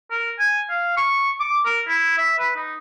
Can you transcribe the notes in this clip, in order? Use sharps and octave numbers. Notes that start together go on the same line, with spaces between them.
A#4
G#5
F5
C#6
D6
A#4
E4
E5
B4
D#4